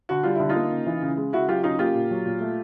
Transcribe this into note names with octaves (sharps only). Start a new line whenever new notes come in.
D3 F#4
G3 F4
D3 E4
D#4 F4
A#3
C#3
E3
C#3
G#3
C#3 E4 F#4
F#3 F4 G4
C#3 D#4 F4
A#3 F4 G4
A#2
F#3
A#2
A3